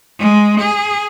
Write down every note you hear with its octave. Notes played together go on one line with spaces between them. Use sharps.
G#3
G#4